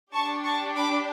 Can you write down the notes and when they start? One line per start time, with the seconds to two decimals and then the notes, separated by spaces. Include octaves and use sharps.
0.14 D4 G4 A5 C#6
0.44 A5 C#6
0.75 B5 D6